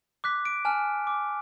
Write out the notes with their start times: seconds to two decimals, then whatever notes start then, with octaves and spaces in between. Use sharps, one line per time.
0.24 D6 F#6 B6
0.45 D7
0.65 G#5 A5 F6
1.07 D6